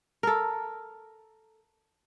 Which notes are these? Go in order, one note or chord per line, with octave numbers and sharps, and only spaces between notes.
A4 A#4